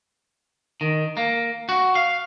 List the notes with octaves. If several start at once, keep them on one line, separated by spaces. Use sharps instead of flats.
D#3
A#3
F#4
F5